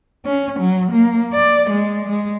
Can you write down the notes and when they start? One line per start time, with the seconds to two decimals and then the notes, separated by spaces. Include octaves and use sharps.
0.25 C#4
0.59 F#3
0.92 A#3
1.33 D5
1.70 G#3
2.09 G#3